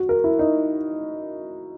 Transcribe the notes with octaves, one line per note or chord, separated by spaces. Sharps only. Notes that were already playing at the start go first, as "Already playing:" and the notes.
Already playing: F#4
A#4
E4
D#4